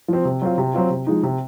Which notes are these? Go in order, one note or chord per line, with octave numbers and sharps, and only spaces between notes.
F3 C4
C3
F#3 C4 F4
C3
F#3 C4 F4
C3
F3 G#3 D#4
C3